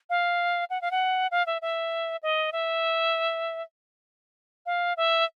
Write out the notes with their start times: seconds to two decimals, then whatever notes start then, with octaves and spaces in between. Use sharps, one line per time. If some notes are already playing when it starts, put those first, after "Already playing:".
0.10 F5
0.70 F#5
0.82 F5
0.91 F#5
1.31 F5
1.47 E5
1.62 E5
2.23 D#5
2.53 E5
4.66 F5
4.97 E5